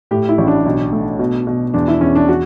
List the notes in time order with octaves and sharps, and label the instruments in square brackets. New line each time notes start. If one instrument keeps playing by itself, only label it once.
[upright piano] A2 G4
E4
A1
D4
B1
A3
B2
B2
E2 D4
E4
E2 C#4
D4
F#4